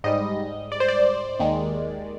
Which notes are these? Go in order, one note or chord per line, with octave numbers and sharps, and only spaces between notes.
G#2 G3 D#5
D5
C5
D5
D#2 D#3 G#3